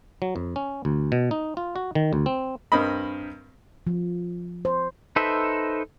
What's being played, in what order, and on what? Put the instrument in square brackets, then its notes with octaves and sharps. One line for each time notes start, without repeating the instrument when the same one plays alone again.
[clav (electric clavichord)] F#3
F2
C#4
D2
B2
D#4
F4
F#4
D#3
D2
C4
[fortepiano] G2 C4 A#4 D#5 B5
[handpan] F3
C5
[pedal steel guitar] D#4 A4 B4 C5 E5